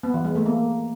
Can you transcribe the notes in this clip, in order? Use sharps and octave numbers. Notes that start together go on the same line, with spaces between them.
B3
E3
G#3
A3
A#3